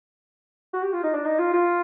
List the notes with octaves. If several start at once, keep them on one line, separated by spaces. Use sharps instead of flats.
F#4
G4
F4
D#4
D4
D#4
F4
F4